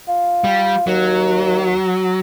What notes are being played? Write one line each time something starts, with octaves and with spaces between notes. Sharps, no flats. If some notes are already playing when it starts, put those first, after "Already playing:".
F4
G3
D#2 F#3